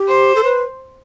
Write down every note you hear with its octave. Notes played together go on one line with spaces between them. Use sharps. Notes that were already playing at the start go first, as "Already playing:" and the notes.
Already playing: G4
C5
A4
B4